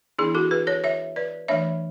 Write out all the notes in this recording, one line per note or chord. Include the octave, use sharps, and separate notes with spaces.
E3 B3 D4 E4 G#4
F#4 A4
G#4 B4
A4 C#5
C#5 E5
B4 D5
E3 A3 D4 C#5 E5